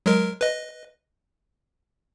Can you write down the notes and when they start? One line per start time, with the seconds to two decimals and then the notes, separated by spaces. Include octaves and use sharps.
0.06 F#3 G#3 A#4
0.41 B4 D#5